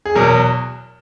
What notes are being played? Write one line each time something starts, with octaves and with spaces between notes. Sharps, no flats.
G#4
E2 B2 F#3 A#4